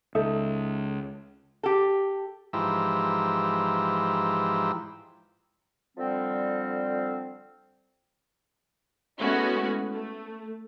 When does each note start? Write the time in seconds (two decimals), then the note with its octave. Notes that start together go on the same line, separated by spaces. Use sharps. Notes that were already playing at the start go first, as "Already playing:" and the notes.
0.15 C#2 D#4 A4 E5
1.63 G4 A4
2.53 G#2 E3 F3 G4 A#5 E6
5.97 D3 F3 G3 C4
9.20 G#3 A3 B3 C#4 E4 F#4
9.92 A3